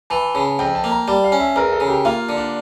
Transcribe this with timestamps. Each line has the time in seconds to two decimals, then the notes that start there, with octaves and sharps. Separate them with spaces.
0.10 E3 A5
0.35 C#3 A5
0.59 F2 G5
0.75 A5
0.84 A#3
0.91 A#5
1.08 G3 A5
1.24 F5
1.32 C#4
1.40 E5
1.56 E2 A#4
1.72 A4
1.80 C#3
1.88 G4
2.05 A#3 F4
2.29 D3
2.37 D4